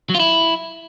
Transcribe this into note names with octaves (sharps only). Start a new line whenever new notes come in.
F#3
F4
E4